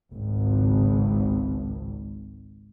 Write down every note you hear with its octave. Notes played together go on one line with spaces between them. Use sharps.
G#1 C#2